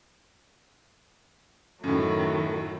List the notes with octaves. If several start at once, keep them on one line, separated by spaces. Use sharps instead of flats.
F#2 A2 D#3 F#3 A3